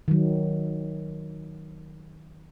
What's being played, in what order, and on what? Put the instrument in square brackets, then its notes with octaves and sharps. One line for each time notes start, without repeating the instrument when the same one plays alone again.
[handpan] D#3 F#3